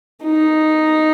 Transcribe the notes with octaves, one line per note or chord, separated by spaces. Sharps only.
D#4